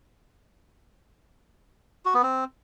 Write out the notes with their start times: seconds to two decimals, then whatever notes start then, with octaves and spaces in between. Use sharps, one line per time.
2.05 F#4
2.14 B3
2.23 C4